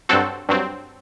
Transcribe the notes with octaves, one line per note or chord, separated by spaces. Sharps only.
G2 F#3 C4 F#4 A4
G2 F#3 C4